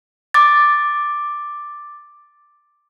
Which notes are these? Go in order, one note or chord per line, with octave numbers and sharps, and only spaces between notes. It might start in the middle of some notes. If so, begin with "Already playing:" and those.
D6 A6